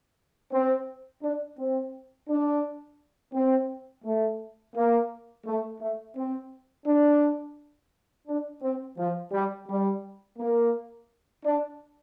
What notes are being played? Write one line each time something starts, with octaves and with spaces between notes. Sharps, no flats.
C4
D4
C4
D4
C4
A3
A#3
A3
A3
C4
D4
D4
C4
F3
G3
G3
A#3
D4